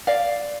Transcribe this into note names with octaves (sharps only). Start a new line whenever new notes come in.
D5 F5